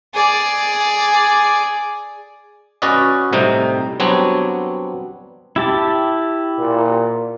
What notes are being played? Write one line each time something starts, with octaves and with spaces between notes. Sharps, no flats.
G#4 D5
C#4 F#4 B4 D5 D#5
A2 C3 G3 D#4
F#3 G3 B3 C4 D4 C#5
E4 G4 A5
A#2